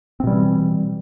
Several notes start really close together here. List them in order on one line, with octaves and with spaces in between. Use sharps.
C4 B2 G3 E3